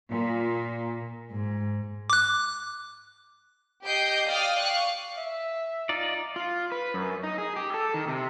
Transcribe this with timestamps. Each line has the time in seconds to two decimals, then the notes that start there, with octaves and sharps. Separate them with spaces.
0.10 A#2
1.33 G#2
2.10 D6 F#6
3.84 G4 D#5 G6 C7 D7
4.29 D5 F5 G5 D#6 F6
4.59 F5 C#6 F#6
5.18 E5
5.89 D#4 F4 D5
6.36 F4
6.72 B4
6.94 F#2
7.23 D#4
7.38 G#4
7.56 G4
7.74 A4
7.94 D#3
8.08 C3